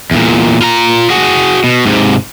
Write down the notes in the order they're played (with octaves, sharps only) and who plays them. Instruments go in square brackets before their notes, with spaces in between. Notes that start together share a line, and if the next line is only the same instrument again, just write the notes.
[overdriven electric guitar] E2 A#2
F4 A#5
F#4 G#4
B2
G#2 C3